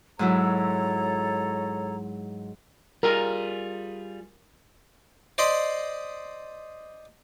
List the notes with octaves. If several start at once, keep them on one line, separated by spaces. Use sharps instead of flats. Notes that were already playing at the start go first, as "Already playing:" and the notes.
G#2 F#3 E4 A4 C#5 A#5
G3 F4 G#4 A#4
C5 D5 D#5 B5 C6